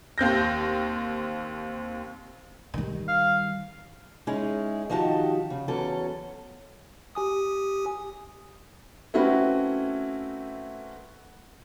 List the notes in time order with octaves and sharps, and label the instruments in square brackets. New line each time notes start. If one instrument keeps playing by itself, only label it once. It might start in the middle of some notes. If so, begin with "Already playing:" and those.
[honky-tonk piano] D#2 C4 G6 A#6
[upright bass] D#3 G3
[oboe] F5
[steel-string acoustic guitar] G#3 C#4 D#4 E4 G#4
D#3 F3 D#4 F#4 G4 A5
C#3
E2 F#3 C#4 A4
[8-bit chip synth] G4 G#5 D#6
[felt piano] A3 C4 C#4 E4 F#4 B4